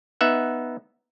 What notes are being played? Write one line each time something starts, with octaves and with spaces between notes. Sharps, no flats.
B3 D#4 E5 F#5